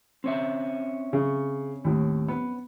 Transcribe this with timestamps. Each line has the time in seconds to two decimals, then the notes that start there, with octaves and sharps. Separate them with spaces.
0.24 C4 C#4 E5
1.13 C#3
1.84 D#2 A2
2.28 B3